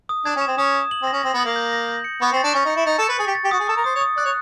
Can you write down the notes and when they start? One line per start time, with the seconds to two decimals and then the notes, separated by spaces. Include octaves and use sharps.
0.09 D#6
0.25 D4 G#6
0.36 C#4
0.41 E7
0.47 C4
0.57 C#4 D#6
0.74 D#6
0.91 F#7
1.02 C4
1.07 A#6
1.12 C#4
1.23 C4 A#6
1.34 B3
1.40 A#3 F#7
1.56 G6
1.73 A#6
1.88 G6
2.04 C#7
2.21 B3 C#6
2.32 C4
2.37 A6
2.43 D4
2.54 C#4 C#6
2.65 D#4
2.70 C#7
2.76 E4
2.86 D#4 A6
2.98 A4
3.03 C#7
3.08 B4
3.19 G#4 A6
3.27 G4
3.35 A6
3.44 G4
3.51 F#4 D#6
3.60 G#4
3.68 A4 D#6
3.76 A#4
3.84 C5 D#6
3.95 C#5
4.01 D#6
4.17 D5 F#6
4.25 C#5